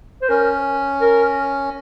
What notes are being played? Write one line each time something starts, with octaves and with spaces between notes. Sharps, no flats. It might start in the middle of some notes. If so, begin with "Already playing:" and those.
C5
C#4 A#4
A#4